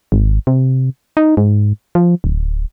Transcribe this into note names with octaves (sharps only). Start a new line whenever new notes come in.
G#1
C3
D#4
G#2
F3
D1